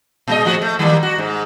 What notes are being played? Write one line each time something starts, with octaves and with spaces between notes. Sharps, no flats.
A#2 G#3 D#5
A2 F3 F#4
A3
D#3 G3 A#3
F#4
G#2